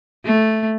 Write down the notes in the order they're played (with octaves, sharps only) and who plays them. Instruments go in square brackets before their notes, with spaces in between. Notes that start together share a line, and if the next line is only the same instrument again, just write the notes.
[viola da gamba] A3